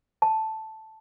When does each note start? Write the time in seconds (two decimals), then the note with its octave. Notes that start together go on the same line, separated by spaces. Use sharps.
0.22 A5